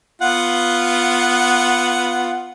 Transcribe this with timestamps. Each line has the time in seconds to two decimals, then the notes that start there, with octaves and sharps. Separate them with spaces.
0.22 B3 F4 F#5